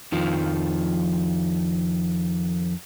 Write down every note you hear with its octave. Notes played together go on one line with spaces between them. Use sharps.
F2 D#3 F3